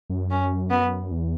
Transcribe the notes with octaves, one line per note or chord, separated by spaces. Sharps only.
F#2
C#4
B3
E2